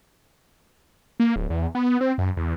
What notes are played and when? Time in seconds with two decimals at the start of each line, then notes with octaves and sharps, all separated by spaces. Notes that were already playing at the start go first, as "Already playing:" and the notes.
1.20 A#3
1.36 D1
1.50 E2
1.75 B3
2.01 C4
2.18 F#2
2.37 E2